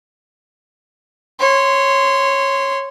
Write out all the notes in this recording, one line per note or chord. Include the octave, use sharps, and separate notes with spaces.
C#5 C6